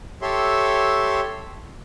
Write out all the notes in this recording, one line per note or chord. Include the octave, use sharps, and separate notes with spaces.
G4 A4 C#5 E5 C6